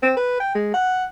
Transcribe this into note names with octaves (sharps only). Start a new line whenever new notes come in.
C4
B4
G5
G#3
F#5